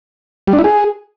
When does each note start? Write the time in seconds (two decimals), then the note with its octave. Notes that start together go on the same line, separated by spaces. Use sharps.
0.47 G3
0.53 D4
0.59 E4
0.64 G#4